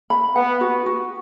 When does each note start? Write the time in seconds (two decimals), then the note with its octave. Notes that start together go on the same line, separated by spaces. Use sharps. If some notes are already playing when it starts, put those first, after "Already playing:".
0.10 B5
0.35 B3 F#5
0.61 F#4
0.86 F#4